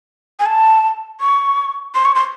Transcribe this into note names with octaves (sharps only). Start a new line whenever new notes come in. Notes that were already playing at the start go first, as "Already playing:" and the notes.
G#5
A5
C#6
C6
C#6
C6